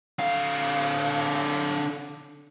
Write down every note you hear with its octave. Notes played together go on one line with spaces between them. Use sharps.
D3 F5